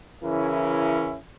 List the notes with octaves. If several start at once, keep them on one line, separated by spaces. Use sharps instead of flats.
C#3 E3 C#4 E4 A#4